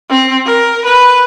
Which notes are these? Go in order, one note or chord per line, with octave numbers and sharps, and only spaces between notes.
C4
A#4
B4